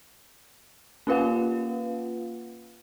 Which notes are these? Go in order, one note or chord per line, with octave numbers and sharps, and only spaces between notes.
A#3 C#4 F4 B4 F5 F#5